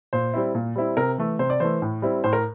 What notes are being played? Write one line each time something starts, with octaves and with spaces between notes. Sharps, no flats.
A#2 C5
G3 C4 E4
A#2
G3 C4 E4
C3 A#4
E3 A3
C3 C5
D5
E3 A3 C5
A2
G3 C4 E4
A2 C5
A#4